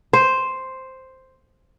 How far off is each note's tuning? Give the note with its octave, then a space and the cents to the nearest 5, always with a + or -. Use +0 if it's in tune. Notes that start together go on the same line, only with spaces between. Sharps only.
C5 +0